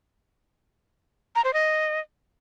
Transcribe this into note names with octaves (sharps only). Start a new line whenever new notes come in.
A#5
C5
D#5